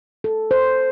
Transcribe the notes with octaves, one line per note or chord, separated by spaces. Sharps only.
A4
C5